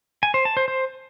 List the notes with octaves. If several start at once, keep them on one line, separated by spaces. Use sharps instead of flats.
G#5
C5
A5
C5
C5